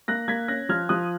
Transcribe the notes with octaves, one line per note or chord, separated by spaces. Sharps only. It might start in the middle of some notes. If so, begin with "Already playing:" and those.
A#3 F#6 A#6
A#3 G#6 B6
C#4 F#6 A#6
F3 F6 G#6
F3 D#6 F#6